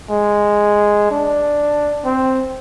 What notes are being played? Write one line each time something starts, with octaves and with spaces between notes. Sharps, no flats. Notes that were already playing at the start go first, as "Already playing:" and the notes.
G#3
D4
C4